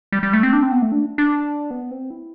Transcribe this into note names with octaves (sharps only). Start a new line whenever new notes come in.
G3
G3
A3
C4
D4
C4
B3
A3
D4
D4
B3
C4
E4